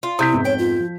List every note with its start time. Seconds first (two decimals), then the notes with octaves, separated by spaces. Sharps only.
0.03 F4
0.19 C3 E4 D#6 G6 B6
0.33 F2 G#2 B3
0.45 C#5 G5
0.59 F4
0.80 F3